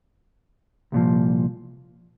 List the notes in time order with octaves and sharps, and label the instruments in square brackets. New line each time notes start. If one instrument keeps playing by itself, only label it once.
[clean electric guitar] C2 A#2 F3